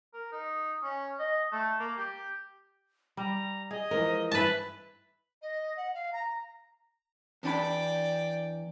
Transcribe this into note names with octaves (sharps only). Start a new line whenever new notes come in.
A#4
D#4
C#4
D#5
A3
A#3
G4
G3 A#5
G#4 D#5
E3 F3 G#3 A#4
G2 E4 B4 A5
D#5
F#5
F5
A#5
E2 D4 D5 G5 B5